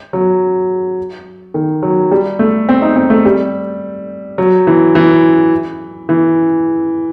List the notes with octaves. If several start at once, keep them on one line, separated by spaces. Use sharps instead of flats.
F#3
D#3
F#3
G3
A3
C4
D#4
C4
A3
G3
F#3
E3
E3
E3